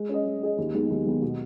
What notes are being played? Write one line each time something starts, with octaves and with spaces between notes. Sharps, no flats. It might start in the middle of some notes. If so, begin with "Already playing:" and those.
Already playing: G#3
C#4 G#4 D#5
G#3
C#4 G#4 D#5
D#2
D#3 G#3 B3
D#2
D#3 G#3 B3
B2